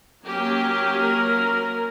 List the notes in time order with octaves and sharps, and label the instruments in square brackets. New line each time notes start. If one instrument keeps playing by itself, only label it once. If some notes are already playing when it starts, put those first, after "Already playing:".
[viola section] F#3 A#3 C#4 G4
A#4